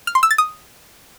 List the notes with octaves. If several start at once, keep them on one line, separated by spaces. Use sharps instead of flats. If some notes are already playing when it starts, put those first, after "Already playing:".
F6
C6
E6
A6
D#6